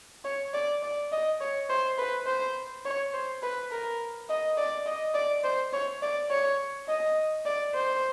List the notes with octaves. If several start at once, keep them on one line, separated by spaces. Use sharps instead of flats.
C#5
D5
D5
D#5
C#5
C5
B4
C5
C#5
C5
B4
A#4
D#5
D5
D#5
D5
C5
C#5
D5
C#5
D#5
D5
C5